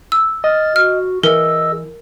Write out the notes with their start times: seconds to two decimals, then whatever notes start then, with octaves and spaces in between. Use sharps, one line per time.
0.12 E6
0.44 D#5 F6 A6
0.76 F#4 F6
1.23 E3 G#4 A#4 D#5 E6